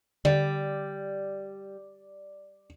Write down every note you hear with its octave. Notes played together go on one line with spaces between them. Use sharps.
D3 G3 D5